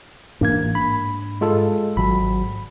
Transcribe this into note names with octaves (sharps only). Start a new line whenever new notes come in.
A1 G#2 A#3 D4 G#6
B5
G#3 F4 A4
G#1 F#3 B5